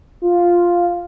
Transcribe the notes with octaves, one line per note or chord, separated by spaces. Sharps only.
F4